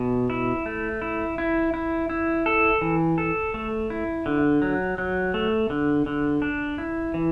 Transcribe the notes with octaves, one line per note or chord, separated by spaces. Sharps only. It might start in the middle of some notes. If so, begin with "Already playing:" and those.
Already playing: B2
E4
A3
E4
E4
E4
E4
A4
E3
A4
A3
E4
D3
F#3
F#3
A3
D3
D3
D4
E4
E3